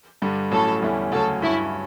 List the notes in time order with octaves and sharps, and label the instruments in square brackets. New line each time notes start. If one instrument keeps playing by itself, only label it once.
[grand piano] G2 D3 G3
[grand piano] A1 A2 F#3 C#4 [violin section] A4
[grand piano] E2 D3 G3 C#4 E4
[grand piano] D2 C#3 F#3 C#4 [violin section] A4
[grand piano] G2 F#3 C#4 [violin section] E4